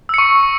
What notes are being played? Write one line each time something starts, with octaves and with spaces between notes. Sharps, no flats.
C#6 E6 C#7